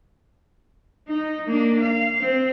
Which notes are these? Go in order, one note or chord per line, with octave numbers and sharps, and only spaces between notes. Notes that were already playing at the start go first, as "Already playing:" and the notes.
D#4
A#3 D4
F5
C4